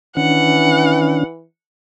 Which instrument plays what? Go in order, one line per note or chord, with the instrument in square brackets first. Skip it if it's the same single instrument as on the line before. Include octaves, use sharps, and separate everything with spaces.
[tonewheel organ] D#3 C#4 D4 [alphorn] E3 [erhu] F#5